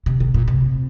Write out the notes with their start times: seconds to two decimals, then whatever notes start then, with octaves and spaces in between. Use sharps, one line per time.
0.06 C3
0.20 C3
0.34 A#2
0.48 C3